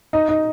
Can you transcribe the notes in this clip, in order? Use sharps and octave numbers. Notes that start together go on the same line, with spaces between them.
D#4
D#4